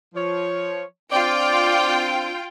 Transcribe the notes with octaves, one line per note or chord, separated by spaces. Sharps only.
F3 C#5
C4 D4 F4 D5 G5